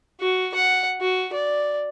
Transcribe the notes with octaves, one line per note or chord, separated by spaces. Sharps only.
F#4
F#5
F#4
D5